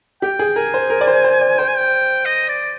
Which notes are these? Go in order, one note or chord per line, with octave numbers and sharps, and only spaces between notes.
G4 G5
G#4
A#4 G#5
C5
A#4
D5
C5
C5
D5
C5 G5
G#5
G5
D#5
D5